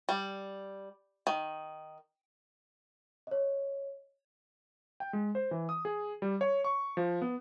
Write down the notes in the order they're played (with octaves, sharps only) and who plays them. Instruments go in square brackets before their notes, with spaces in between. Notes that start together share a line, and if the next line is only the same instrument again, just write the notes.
[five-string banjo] G3
D#3
[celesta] C#5 D#5
[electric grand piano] G5
G#3
C5
E3
D#6
G#4
G3
C#5
C#6
F3
B3